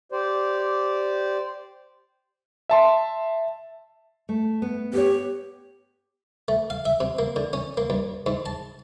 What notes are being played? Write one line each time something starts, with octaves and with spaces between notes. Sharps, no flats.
G4 C5 D5
E5 A5 C6
A3
B3
B3 G4 C#5
A3
F5
E5
C3
A#3
D3
C#4
A#3
G2
G#2
A5